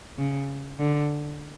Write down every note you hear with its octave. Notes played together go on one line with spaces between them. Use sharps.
C#3
D3